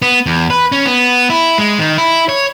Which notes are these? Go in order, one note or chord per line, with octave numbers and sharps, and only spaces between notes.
B3
E2
B4
C#4
B3
E4
G#3
D#3
E4
C#5